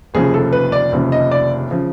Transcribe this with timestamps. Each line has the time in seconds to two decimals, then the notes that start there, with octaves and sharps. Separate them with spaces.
0.14 F1 D#2 C#3 F3 G#4
0.34 A4
0.53 B4
0.72 D5
0.92 F1 D#2 C#3 F3
1.12 D#5
1.32 D5
1.71 C#3 F3